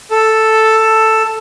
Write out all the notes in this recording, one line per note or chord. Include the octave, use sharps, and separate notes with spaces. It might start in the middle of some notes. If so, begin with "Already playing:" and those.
A4